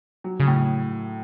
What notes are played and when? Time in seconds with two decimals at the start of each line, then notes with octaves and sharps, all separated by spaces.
0.24 F#3
0.40 C#3
0.47 A2